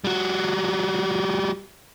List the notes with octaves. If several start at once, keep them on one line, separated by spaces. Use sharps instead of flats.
G3 F#4